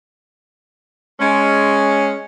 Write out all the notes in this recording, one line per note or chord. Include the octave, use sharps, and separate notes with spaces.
G#3 C#4